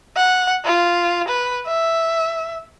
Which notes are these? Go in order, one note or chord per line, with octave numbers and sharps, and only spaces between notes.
F#5
F4
B4
E5